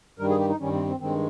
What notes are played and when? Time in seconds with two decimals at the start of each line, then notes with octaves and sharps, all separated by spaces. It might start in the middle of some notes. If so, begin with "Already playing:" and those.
0.19 G2 D#3 G3 A#4
0.29 G#4
0.39 G4
0.49 D#4
0.59 G2 D#3 G3 C#4
0.73 C4
0.87 C4
1.00 G2 D#3 G#3 C4